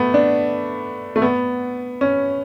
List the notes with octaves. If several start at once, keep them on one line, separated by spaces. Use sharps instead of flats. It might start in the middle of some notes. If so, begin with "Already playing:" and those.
Already playing: A3 B3
D4
A3
B3
C#4